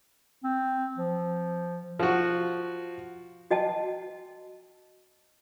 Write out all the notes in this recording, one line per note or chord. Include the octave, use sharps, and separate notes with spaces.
C4
F3
F3 F#4
F#4 D#5 G5 A5